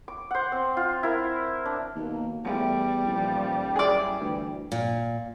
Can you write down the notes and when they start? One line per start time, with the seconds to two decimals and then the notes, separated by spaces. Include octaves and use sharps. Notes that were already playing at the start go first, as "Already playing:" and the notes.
0.08 D6
0.31 C5 F#5
0.52 C4
0.77 F4
1.03 E4 A#4
1.66 D4
1.96 D#2 B2 A#3
2.45 E2 G3 A3
3.06 D#1 A#2 E3 F3
3.76 F#2 E4 G#4 D5
4.20 D2 E3
4.72 A#2